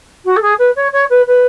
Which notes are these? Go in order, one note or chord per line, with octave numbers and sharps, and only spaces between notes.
F#4
A4
G#4
B4
C#5
C#5
B4
B4